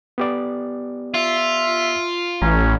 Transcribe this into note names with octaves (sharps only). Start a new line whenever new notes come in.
B3 G4 D5
F4 E5
A1 C#4 A#5